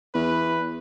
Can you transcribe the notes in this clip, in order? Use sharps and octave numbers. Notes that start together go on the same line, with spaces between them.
E2 B4